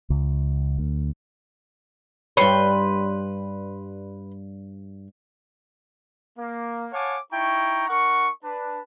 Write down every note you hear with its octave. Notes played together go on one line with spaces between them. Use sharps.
C#2
D2
G2 G3 B4 C#5 C6
A#3
C#5 F5 F#5 G#5 A5 D6
D#4 E4 G5 A#5 C#6
D4 A#4 F#5 C#6
D4 B4 A5